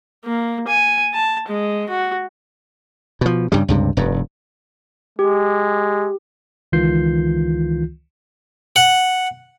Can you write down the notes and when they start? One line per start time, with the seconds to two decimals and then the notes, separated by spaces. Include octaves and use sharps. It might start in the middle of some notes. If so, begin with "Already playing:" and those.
0.25 A#3
0.67 G#5
1.14 A5
1.48 G#3
1.89 F#4
3.21 B2 F3
3.52 G2 C#3 G3
3.68 C#2 G2 C3
3.97 F1 G2
5.19 G#3 G4
6.72 C#2 D#3 E3 F4 G6 C7
8.76 F#5